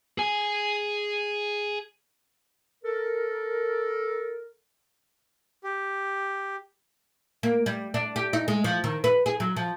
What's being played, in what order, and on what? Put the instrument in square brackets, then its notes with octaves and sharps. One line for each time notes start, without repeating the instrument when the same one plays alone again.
[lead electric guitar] G#4 G#5
[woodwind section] A4 A#4
[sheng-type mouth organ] G4
[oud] A#3
G3
D4
G4
D#4
G#3
F3
D#3
B4
G#4
F#3
F3